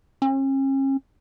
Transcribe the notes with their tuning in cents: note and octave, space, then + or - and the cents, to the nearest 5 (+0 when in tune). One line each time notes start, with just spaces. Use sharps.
C#4 -40